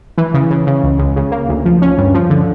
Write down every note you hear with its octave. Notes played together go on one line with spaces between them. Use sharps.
E3
C#3
C#3
C#3
C#2
C#2
C#3
A#3
D2
F3
C#4
G2
F3
D3